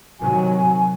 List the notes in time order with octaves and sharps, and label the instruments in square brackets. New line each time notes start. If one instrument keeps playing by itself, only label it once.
[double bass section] C3 D#3 F#3 [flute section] G#5